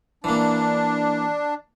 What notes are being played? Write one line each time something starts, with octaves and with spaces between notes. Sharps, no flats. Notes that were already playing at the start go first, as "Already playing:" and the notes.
E3 A#3 D4